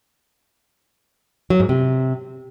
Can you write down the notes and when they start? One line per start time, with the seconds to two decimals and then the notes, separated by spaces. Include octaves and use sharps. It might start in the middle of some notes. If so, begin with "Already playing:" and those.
1.50 F#3
1.60 G#2
1.69 C3